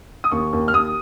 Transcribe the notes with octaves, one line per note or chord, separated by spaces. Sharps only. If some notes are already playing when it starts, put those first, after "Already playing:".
D#6
D#2 C#6
D#2
F6
D#2 D#6